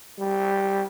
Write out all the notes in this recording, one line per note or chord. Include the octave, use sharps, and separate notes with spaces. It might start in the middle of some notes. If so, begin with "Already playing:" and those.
G3